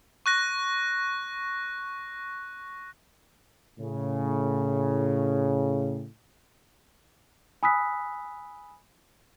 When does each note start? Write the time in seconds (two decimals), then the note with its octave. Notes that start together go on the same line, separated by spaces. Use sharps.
0.26 C#6 F#6 A#6
3.79 A2 C#3
7.63 G#5 B5 D#6 E6 F#6 B6